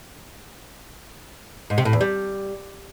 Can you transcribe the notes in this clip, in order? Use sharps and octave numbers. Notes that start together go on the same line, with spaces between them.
G#2
C3
A2
E2
G3